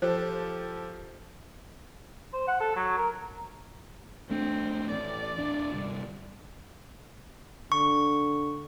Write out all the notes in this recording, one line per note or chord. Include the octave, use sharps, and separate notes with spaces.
F3 G4 A4 C5
C5
F#5
A4
F#3
A#4
G#1 A3 C4 D4
A1 D5
D1 D4
G1 C2 G3
D3 C#6